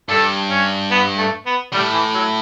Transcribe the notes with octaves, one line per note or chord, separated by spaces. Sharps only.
G2 A4
C#4
B3
A3
B3
A2 G3
E3
F#3